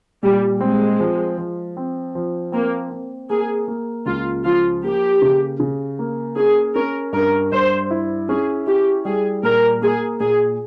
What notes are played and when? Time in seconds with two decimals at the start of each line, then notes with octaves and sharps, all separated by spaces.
0.23 A#2 G3
0.61 G#3 C4
1.00 F3
1.38 F3
1.77 C4
2.15 F3
2.52 A#3 C4
2.91 C4
3.30 A#3 G#4
3.68 A#3
4.06 C#2 F4
4.45 F3 F4
4.83 A#3 G4
5.22 C#3
5.60 C#3
5.99 A#3
6.36 C#4 G#4
6.75 C#4 A#4
7.13 G2 A#4
7.52 G2 C5
7.91 E4
8.29 C#4 G#4
8.67 E4 G4
9.05 G3 G#4
9.43 A#2 A#4
9.82 A#3 G#4
10.20 A#2 G#4